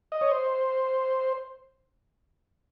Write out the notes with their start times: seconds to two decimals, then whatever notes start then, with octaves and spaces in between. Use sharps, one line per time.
0.12 D#5
0.21 C#5
0.31 C5